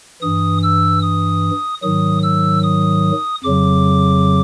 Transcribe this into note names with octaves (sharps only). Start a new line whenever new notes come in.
G2 E3 D#6
E6
D#6
G#2 D#3 F#3 D#6
E6
D#6
F2 C#3 F#3 D6